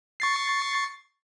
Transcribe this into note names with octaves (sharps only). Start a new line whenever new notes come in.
C#6 A6 C7